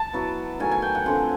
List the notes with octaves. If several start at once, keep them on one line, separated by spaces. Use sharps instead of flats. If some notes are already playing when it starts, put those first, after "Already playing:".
Already playing: A5
F#3 B3 E4
D#3 F#3 A3 G#5
G#5
G5
F#5
D3 F3 A3 C4 G#5